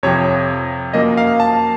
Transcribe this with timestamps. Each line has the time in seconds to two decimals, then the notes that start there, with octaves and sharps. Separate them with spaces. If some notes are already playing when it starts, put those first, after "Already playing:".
0.03 F2 C3 F3 C#5
0.94 F#2 F3 A#3 D#5
1.17 F5
1.40 A5